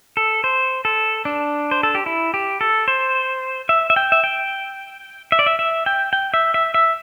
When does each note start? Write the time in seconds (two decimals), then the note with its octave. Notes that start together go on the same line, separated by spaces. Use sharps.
0.17 A4
0.44 C5
0.85 A4
1.25 D4
1.71 C5
1.83 A4
1.95 G4
2.06 E4
2.34 G4
2.61 A4
2.88 C5
3.69 E5
3.90 E5
3.96 G5
4.12 E5
4.24 G5
5.32 E5
5.39 D5
5.46 E5
5.59 E5
5.86 G5
6.13 G5
6.34 E5
6.54 E5
6.74 E5